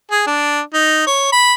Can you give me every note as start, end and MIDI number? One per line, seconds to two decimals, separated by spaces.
0.11 0.22 68
0.27 0.60 62
0.74 1.05 63
1.07 1.30 73
1.32 1.54 83